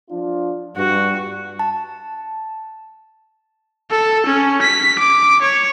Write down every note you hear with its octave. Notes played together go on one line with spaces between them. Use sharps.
F3 D4 F4
G2 F#4
A5
A4
C#4
B6
D6
C#5